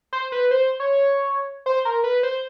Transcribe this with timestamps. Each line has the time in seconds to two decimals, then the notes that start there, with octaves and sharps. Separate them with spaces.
0.13 C5
0.32 B4
0.51 C5
0.80 C#5
1.66 C5
1.85 A#4
2.04 B4
2.23 C5